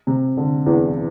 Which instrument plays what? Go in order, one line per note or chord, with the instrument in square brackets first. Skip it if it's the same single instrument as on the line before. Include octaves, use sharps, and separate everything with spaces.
[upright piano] C3
D3
E2 E3